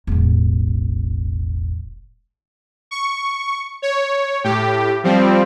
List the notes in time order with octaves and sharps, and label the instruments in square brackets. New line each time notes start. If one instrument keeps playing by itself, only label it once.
[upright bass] E1 A1
[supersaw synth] C#6
C#5
A2 G4
F3 G3 C4